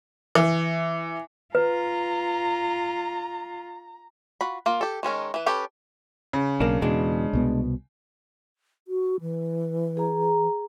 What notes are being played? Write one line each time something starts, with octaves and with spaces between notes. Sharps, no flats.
E3
F4 B4 A#5
F4 F#4 B5
A#3 F4
G4 A4
D#3 G#3 C#4 A#4
E3 B4
C#4 G4 A4 B4
C#3
B1 A#3 D4
E2 B2 G#3 D4
C2 B2 B3
F#4
E3
G#4 A#5